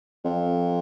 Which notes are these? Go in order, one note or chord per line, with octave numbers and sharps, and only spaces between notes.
F2